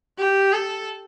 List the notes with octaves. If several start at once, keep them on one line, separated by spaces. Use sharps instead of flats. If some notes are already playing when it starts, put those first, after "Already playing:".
G4
A4